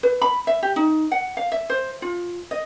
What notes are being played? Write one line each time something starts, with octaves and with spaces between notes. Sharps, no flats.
B4
B5
E5
G4
D#4
F#5
F5
E5
C5
F4
D#5